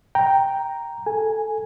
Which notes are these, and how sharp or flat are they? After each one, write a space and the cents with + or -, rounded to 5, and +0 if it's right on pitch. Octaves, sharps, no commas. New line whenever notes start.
G5 +0 A#5 +0
A4 +0 G#5 +0